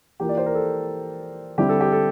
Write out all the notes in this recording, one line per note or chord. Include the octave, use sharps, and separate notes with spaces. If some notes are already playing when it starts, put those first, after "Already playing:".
E3 A#3 F4 G4
D5
C5
A#4
A4
D3 G3 C4 E4 G4
A4
G4
A4